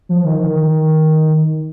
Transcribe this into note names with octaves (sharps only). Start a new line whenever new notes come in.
F3
D#3
D#3